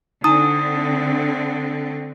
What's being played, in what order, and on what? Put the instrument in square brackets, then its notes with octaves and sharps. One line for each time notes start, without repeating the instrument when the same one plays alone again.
[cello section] D3 A3 C4 [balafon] D#4 G#5 [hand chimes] D#6